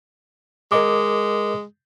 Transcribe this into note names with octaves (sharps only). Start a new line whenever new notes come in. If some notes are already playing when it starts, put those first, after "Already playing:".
G#3 A#4 D#5 D6